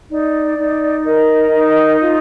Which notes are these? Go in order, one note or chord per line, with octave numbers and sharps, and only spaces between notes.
D#4 D5
D#4
A#4 D#5
D#4
F4